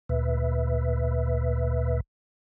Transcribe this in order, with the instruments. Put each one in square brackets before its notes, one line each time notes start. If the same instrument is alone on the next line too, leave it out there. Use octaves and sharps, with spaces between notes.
[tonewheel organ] D2 A#2 B4 E5